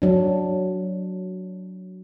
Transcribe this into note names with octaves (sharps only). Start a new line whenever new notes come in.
F#3 D4